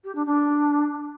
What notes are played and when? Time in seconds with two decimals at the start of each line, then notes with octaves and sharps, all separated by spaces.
0.04 G4
0.15 D4
0.26 D4